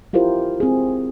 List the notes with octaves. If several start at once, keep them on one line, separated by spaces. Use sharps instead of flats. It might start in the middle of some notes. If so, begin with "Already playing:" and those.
E4 F4 G4 A#4 C5
C4 G#4